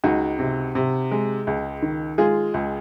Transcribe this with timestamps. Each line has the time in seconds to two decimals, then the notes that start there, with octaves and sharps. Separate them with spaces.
0.04 C#2 D#4 F#4
0.39 C3
0.75 C3
1.12 G#3
1.47 C#2
1.82 D#3
2.18 G#3 F4 G#4
2.54 C#2